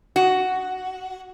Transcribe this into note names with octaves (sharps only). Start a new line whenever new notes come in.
F#4